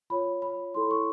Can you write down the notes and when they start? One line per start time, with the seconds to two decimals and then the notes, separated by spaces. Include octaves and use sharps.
0.10 F4 A#4 C#5 B5
0.42 B5
0.74 E4 A4 C#5 C6
0.91 C#6